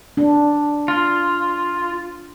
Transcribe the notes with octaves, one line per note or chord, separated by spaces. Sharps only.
D4
F4